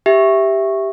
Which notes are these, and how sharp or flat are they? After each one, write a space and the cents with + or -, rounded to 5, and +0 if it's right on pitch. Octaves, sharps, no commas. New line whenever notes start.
G4 +0 E5 +0